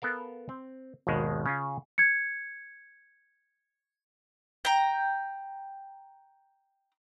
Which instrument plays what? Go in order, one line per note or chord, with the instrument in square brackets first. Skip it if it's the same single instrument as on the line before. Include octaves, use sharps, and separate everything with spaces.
[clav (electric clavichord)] B3 A4 A#4 F5
C4
G#1 D#2 B2 D#3 G#3
C#3 C#4 F4
[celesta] G#6 C#7
[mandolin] G5 A#5